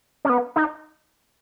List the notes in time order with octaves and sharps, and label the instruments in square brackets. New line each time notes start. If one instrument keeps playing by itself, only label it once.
[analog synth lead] C#4
B3
D#4